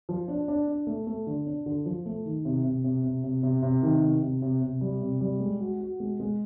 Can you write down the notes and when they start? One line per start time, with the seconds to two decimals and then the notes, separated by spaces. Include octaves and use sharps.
0.09 F3
0.28 D4
0.48 D4
0.67 D4
0.87 A3
1.07 A3
1.27 D3
1.46 D4
1.66 D3
1.86 F3
2.06 A3
2.25 D#3
2.45 C3
2.65 C3
2.84 C3
3.04 C3
3.24 C3
3.43 C3
3.63 C3
3.83 D#3
4.02 C3
4.22 C3
4.42 C3
4.62 C3
4.81 G3
5.02 C3
5.21 G3
5.40 G#3
5.60 F#4
5.80 F#4
6.00 G#3
6.20 G#3